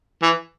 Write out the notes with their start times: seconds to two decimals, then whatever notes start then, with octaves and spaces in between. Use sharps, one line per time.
0.23 E3